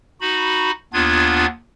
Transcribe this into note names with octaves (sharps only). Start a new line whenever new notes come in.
D#4 F#4 B5
D#2 B3 D4 F4 G#6